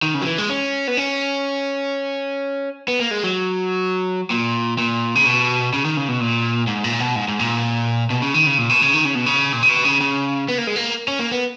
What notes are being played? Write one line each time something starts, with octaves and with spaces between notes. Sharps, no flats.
D#3
C#3
F#3
E3
G#3
C#4
B3
C#4
B3
A#3
G#3
F#3
A#2
A#2
C#3
B2
C#3
D#3
C#3
B2
A#2
G#2
A#2
B2
G#2
G#2
A#2
B2
C#3
D#3
C#3
A#2
B2
C#3
D#3
C#3
B2
C#3
A#2
C#3
B2
C#3
C#3
B3
A#3
G#3
A#3
C#4
A#3
B3